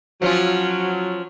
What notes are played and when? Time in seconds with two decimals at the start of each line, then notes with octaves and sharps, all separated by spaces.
0.22 F3 F#3 C#4 F4